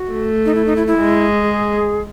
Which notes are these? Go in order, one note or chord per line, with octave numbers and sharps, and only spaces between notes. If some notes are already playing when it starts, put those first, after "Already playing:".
Already playing: F#4
A3
D#4
E4
D#4
E4
E4
G#3
G#4